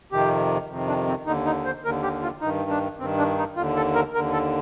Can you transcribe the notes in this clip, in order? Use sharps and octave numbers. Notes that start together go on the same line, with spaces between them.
F2 C3 D#3 G4
F2 C3 D#3
D4
C4
D#2 D3 D#4
D#4
C5
D#2 D3 A#4
G4
F4
G2 D#3 D#4
D4
G2 D#3 C4
D4
D#4
D#2 D3 F4
A4
A#4
D#2 D3 A#4
A4